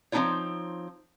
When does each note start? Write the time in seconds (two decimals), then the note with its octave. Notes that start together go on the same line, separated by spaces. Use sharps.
0.12 F3 C4 C#4 D#4 F4 C#5